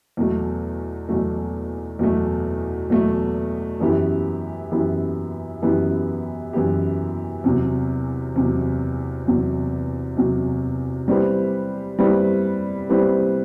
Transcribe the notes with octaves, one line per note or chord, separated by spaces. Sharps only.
E2 B2 F#3 A3
E2 B2 F#3 A3
E2 B2 F#3 A3
E2 B2 F#3 A3
F#2 E3 B3 E4 G4
F#2 E3 B3 E4 G4
F#2 E3 B3 E4 G4
F#2 E3 B3 E4 G4
E2 C3 F#3
E2 C3 F#3
E2 C3 F#3
E2 C3 F#3
G3 C4 E4 G4 B4
G3 C4 E4 G4 B4
G3 C4 E4 G4 B4